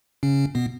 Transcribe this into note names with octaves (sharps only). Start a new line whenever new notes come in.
C#3 C#4
B2 B3